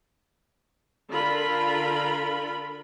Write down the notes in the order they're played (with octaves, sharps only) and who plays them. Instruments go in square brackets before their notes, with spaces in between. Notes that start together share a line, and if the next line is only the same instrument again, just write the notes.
[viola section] D3 F4 A#4 B5